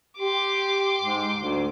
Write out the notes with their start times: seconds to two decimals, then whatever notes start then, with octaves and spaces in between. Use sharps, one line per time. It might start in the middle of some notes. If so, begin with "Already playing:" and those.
0.18 G4 C6 D6
1.01 G#2
1.37 D2